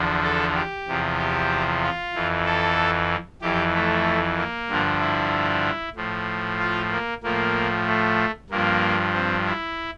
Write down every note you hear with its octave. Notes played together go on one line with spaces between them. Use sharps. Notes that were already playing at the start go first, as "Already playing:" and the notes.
Already playing: E2 D3 F3
A4
G4
E2 C3 F3
G4
F4
F2 E3
A4
F2 E3 G4
A3
A#3
G2 D3 F3
E4
A2 F3
F4
A#3
A2 F3 A#3
A3
G2 F3 A#3
C4
E4